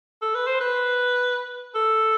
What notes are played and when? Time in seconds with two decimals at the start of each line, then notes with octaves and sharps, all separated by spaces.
0.22 A4
0.35 B4
0.47 C5
0.61 B4
1.75 A4